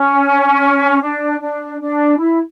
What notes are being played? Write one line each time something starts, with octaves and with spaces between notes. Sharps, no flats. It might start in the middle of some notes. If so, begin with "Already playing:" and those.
Already playing: C#4
D4
D4
D4
E4